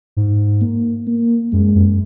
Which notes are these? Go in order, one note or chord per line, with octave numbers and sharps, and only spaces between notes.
G#2
A#3
A#3
F#2 G#3
F#2